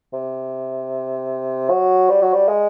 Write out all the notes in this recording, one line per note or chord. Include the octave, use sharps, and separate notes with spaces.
C3
F#3
G3
F#3
G3
G#3